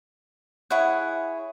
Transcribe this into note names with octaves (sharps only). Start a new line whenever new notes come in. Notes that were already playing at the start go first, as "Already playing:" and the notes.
E4 G#4 C#5 F#5